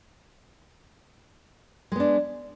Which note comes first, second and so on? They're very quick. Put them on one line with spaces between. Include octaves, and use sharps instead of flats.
G#3 B3 D4